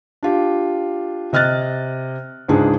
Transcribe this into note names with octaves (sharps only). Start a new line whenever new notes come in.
D4 F4 G4
C3 D#5 F6 F#6 A6
C#2 G#2 D4 G#4